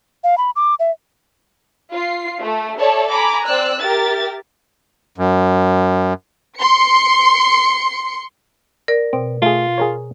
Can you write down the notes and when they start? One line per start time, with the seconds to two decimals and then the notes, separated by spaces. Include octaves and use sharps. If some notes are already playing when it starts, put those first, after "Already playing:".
0.24 F5
0.38 B5
0.56 D6
0.79 E5
1.93 F4 C7
2.40 A3
2.78 A4 C#5 D5 E5 A5
3.11 G#5 A#5 B5 D6
3.46 C4 D5 E6 F#6
3.80 G4 A#4 E5 A6
5.18 F#2
6.58 C6 C#7
8.88 A#4 D5
9.13 B2 C4
9.42 A3 F4 G#4
9.78 G#4 A#4 C#5